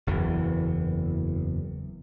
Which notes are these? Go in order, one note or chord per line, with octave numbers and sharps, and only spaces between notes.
F#1 E2 E3